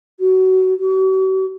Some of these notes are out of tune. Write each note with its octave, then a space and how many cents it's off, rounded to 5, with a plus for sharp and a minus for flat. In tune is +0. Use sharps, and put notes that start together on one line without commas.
F#4 +20
F#4 +45